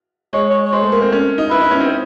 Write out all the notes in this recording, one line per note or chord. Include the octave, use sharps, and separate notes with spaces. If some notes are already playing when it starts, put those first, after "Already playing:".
G#3 C#5
C#5
C#5
G#3 C5
A3
A#3
C4
C#4
D#4
E4 B4
D#4
C#4
C4